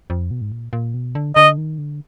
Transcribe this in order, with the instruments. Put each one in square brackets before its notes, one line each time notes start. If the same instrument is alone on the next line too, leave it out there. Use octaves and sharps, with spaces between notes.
[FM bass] F2
B2
G#2
A#2
A#2
B2
D3
[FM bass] D3 [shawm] D#5
[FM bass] D#3
D3